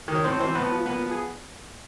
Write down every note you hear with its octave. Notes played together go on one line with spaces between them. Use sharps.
D#3
C#5
A2 C4 C5
E3 C4 C5
A2 B3 B4
F3
A#2 B3 B4
F3
G#4